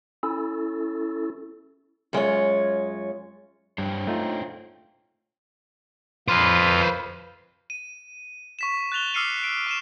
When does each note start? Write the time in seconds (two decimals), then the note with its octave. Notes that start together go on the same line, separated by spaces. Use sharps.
0.23 C#4 E4 A4
2.13 F#2 G#3 F4 C#5
3.78 G2 C5 C#5 G5
4.07 A3 D#4 F4
6.28 F2 F4 B4 C5
7.70 D#7
8.59 C#6 B6 E7
8.92 F#6 A6 F7 G7
9.14 D6 E6 F6 C7 C#7 D#7
9.44 D7
9.67 C#6 D#7 E7